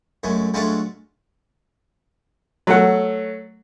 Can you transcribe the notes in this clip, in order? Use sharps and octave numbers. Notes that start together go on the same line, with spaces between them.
F#2 G#3 A3
F#3 G#3 A3 D4 F4 A4
F#3 A3 F#5